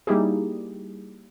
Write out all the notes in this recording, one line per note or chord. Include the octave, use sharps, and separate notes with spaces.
G3 A#3 D#4 E4 G4 G#4